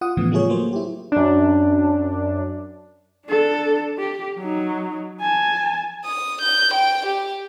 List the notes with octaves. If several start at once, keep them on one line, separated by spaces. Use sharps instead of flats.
F4 F#5 D#6
A2 C#3 E3 F3 B3
G3 A3 F4 G#4 C#5
F#3 A#3 C5
E4 G4
F#2 D4
D4 A4
G4
F#3 D#4
G#5 A5
D#6
G6
G5
G4